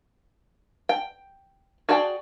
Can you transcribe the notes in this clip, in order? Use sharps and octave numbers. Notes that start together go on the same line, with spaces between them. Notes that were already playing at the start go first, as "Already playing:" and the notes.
G5
F#4 G#4 D5 G5 A5